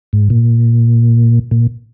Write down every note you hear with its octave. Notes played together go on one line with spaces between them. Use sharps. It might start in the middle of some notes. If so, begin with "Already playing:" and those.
G#2
A#2
A#2